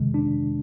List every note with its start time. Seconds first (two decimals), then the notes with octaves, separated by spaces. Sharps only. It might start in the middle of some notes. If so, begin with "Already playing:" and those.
Already playing: F2 C3 D#3 G#3
0.14 D4